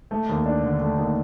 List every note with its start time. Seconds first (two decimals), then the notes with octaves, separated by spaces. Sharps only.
0.11 A3
0.29 D#2
0.46 D4
0.64 D3
0.81 A3
0.98 D#2